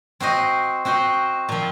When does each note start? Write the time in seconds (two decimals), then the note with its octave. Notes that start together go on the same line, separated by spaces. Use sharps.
0.20 C4 F#4 C5 D#5
0.85 C4 F#4 C5 D#5
1.49 A#2 F3 C4